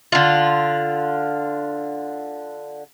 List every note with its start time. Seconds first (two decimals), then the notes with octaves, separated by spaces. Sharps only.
0.12 D3 F4